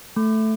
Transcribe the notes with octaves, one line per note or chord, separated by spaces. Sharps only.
A3